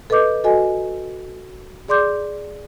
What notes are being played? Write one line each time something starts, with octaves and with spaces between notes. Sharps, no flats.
A4 B4 D#5 D6 G6
F#4 A4 D#5 G#5
G#4 D5 C6 D6 G6